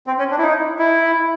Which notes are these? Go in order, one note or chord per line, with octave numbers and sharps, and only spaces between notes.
C4
C#4
D4
E4
D#4
E4